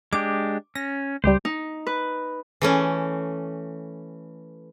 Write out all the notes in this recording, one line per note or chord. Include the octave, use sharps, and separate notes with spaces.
G#3 D4 G4 D6
C#4 A#6
C#2 G3 G4 C5
D#4
B4
E3 A3 C#4